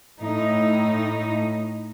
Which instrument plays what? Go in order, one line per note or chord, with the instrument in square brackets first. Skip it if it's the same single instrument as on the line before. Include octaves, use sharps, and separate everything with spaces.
[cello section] A2 D#4